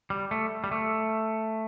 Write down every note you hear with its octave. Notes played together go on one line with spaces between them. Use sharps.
G3
A3
G3
A3